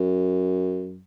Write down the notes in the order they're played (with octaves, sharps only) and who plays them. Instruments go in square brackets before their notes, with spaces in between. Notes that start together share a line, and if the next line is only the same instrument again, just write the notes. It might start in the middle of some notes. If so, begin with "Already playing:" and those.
Already playing: [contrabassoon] F#2